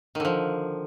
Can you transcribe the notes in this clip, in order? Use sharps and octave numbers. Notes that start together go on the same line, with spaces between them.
D3 D#3 F3